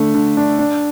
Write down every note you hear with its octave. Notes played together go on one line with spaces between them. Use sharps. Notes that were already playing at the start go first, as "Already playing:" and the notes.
Already playing: D3 A3
D3
D4
D4